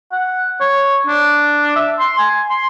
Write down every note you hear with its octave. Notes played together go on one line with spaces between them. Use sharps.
F#5
C#5
D4
E5
C6
G#5
C6